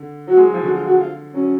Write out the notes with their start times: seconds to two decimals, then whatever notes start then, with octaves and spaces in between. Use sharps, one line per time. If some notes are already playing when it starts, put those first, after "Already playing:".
Already playing: D3
0.27 F#3 F#4
0.37 G#3
0.45 F#3
0.54 F3
0.63 D3 F#4
0.75 F4
0.87 F#4
0.99 F4
1.34 F#3 C#4